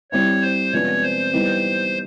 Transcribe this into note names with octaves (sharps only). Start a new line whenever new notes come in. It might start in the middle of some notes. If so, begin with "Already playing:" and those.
G3 C4 E4 C#5
C5
C3 F3 G#3 B3 D4 C#5
C5
E3 G3 B3 D#4